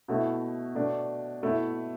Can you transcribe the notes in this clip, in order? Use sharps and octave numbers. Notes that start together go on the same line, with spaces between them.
B2 A3 E4
B2 A3 D4
B2 A3 E4